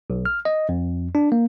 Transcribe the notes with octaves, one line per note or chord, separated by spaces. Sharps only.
B1
F6
D#5
F2
D4
A#3